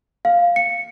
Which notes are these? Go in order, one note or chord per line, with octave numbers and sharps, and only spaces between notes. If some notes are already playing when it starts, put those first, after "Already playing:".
F5
C#7